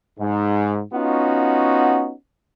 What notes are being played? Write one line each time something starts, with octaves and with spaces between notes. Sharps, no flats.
G#2
B3 C#4 D#4 F4 F#4